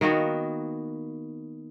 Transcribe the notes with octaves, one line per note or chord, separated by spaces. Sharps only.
D#3 A#3 B3 F#4